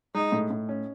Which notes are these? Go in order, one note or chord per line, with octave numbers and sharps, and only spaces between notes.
G#3 D#4
A2
A2
C#4